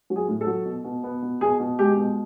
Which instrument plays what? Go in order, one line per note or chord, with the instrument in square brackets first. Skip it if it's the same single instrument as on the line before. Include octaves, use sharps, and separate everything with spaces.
[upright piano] F#3
G#4
A2
A4
F#3
B2
B2
B3
B2
B2 G#4
B2
G#3 G4
B2